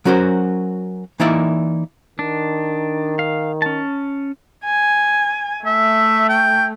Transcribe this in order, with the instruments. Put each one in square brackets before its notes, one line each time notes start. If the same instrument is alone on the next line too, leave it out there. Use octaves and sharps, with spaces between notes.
[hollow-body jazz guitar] F#3 C#4 F#4 A#4 C5
E3 A#3 D#4 E4 D5 E5
[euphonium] D#3 [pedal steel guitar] D4
[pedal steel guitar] F5
C#4 A5
[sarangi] G#5
[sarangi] A3 [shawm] E5
[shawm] G5